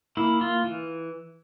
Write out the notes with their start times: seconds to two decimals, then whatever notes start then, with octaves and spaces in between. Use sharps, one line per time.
0.17 A#3 E4
0.41 F4
0.64 E3